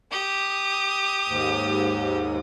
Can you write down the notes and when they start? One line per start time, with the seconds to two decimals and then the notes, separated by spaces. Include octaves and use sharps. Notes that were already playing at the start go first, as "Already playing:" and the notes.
0.12 G4 D#6
1.28 D#2 G#2